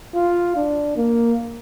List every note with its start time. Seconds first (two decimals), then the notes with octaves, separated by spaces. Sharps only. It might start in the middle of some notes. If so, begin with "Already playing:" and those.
0.15 F4
0.56 D4
0.97 A#3